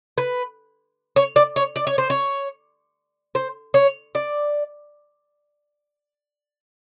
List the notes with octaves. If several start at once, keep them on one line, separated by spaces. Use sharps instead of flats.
B4
C#5
D5
C#5
D5
C#5
C5
C#5
C5
C#5
D5